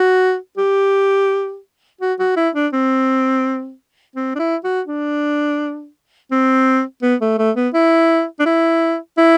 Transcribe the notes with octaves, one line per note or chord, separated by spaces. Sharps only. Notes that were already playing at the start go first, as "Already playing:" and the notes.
Already playing: F#4
G4
F#4
F#4
E4
D4
C4
C4
D4
E4
F#4
D4
C4
B3
A3
A3
B3
E4
D4
E4
E4